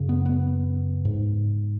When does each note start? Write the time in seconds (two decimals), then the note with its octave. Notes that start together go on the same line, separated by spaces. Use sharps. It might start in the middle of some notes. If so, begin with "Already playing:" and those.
Already playing: F#2 C#3
0.09 B3
0.26 B3
1.05 G#2